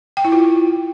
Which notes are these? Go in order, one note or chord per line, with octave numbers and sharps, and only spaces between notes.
G5
E4
F4